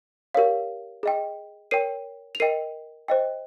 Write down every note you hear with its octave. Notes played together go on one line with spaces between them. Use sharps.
G4 A#4 C#5 F5
G#4 D#5 G5
A#4 C#5 G5 C7 D#7
F7
A#4 D#5 G5 C7 D#7
C5 D#5 G5